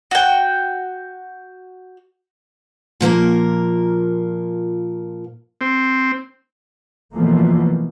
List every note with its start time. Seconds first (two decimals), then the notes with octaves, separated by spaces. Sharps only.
0.11 F#4 G5
3.01 A#2 F3 A#3 A#4
5.61 C4
7.13 B2 E3 F3 A3 A#3